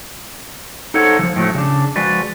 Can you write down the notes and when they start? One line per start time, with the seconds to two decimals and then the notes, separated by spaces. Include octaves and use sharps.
0.94 D#4 A4 C5 C#5 F#5
1.19 E3 F3
1.36 A2 F3 F#3 A3
1.54 C#3 D4
1.96 F3 G#3 F#4 B4 D5